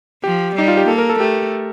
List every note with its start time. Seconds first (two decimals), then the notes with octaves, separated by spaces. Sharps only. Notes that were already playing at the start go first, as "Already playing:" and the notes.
0.24 F3 G4
0.56 G3 D#4
0.68 F4
0.77 G4
0.88 A#3 A4
0.98 A#4
1.09 A4
1.19 A3 G4